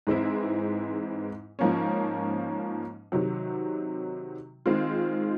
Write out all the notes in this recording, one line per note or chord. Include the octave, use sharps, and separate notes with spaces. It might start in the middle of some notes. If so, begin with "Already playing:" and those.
G#2 E3 G#3 C4 E4
G#2 F3 A#3 C#4
C3 D#3 F#3
D#3 G#3 C4 F4